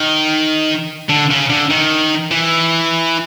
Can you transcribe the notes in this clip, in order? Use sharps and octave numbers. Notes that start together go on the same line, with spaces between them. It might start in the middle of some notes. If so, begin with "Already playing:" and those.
Already playing: D#3
D3
C#3
D3
D#3
E3